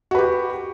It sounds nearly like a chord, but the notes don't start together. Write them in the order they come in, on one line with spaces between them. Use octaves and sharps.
F#4 B4 G4